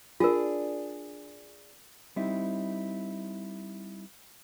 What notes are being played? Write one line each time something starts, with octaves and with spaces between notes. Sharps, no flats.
D4 F4 G#4 A#4
G3 C4 D#4 E4